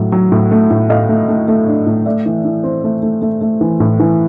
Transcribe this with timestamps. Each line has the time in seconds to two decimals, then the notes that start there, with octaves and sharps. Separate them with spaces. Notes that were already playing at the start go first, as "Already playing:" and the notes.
Already playing: A2 F#3
0.12 F#3
0.32 A2
0.51 A3
0.71 A2
0.90 A2 D#5 F5
1.09 A3
1.29 A3
1.48 A3
1.68 D4
1.87 A2
2.06 A3 D5 E5
2.26 E3
2.45 E3
2.64 C4
2.84 A3
3.03 A3
3.22 A3
3.41 A3
3.61 E3
3.80 A2
4.00 E3